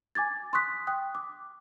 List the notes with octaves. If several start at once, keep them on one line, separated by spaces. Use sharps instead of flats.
G#5 D6 G#6 A6
C6 C#6 D#6 F#6 B6
G5 D#6 F#6
D6